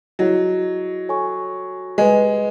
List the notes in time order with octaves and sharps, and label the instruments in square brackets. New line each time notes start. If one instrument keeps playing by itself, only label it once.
[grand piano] F#3 [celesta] E4 G#4 D#5
[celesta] A4 C#5 G#5 C#6
[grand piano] G#3 [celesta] B4 D#5 G#5